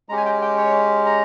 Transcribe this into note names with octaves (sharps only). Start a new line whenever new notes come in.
G#3 C#4 G4 A#5
G#5
G5
G5
C#5
A#5